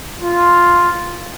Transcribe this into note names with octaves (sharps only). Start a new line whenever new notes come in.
F4